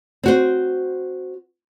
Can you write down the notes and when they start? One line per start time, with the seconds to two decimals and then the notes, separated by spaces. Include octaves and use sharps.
0.24 C4 F#4 C5